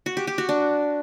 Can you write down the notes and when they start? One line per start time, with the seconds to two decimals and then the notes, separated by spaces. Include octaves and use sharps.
0.06 F#4
0.17 G4
0.27 G4
0.38 F#4
0.49 D4